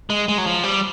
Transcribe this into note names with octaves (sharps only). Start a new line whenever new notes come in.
G#3
G#3
F#3
F3
G3